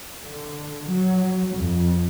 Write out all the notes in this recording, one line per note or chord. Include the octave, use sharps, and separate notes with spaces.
D3
F#3
F2